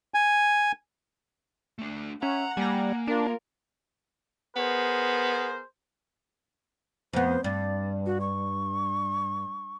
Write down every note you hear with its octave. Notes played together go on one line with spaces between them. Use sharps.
G#5
A3 D4
C#4 E5 F#5 A#5
G3 A#3 G#5 A#5
D4 F4 A#4
B3 G#4 A#4 C5
F2 B3 C5
G2 D5
F#4
C#6